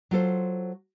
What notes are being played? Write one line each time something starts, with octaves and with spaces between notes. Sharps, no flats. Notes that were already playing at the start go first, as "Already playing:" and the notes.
F#3 F4 A4 C5